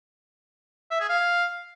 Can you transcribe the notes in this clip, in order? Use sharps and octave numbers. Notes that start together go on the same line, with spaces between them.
E5
G#4
F5